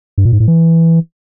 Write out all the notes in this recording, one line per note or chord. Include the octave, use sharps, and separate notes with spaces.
G2
A#2
G#2
A2
E3